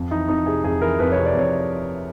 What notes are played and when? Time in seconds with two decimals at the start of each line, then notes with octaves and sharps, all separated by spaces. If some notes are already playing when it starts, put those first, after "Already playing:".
Already playing: F2
0.11 E3 D#4
0.28 F2 D#4
0.46 C3 G#4
0.64 F2 G#4
0.81 E3 A#4
0.99 F2 B4
1.12 C#5
1.17 C3
1.26 D5
1.35 F2 C#5